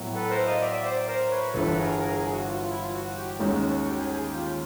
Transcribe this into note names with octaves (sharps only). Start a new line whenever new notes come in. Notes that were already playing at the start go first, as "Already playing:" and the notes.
Already playing: A2 F#3 B3 E4
A4 B4
A#4 C5
D#5 F5
D5 E5
D5 E5
C5 D5
A#4 C5
B4 C#5
G1 G2 E3 A4 B4
G#4 A#4
G#4 A#4
G#4
F#4
F4
F4
E4
F4
F#4
G4
D#2 D#3 G#3 C#4 F#4
G4
G#4
G#4
G4
F4